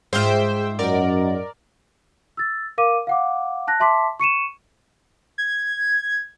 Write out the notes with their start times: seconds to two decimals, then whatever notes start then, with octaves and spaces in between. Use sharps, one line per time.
0.13 G#2 F4 G#4 C5 E5 G5
0.79 F#2 A#4 D5 D#5 F#5
2.37 E6 A6
2.78 A#4 F5 D6 D#7
3.07 F5 F#5 D6
3.68 A5 F#6 A#6
3.80 E5 A5 C6 D6 B6
4.20 C#6 C#7 D#7 E7
5.38 G#6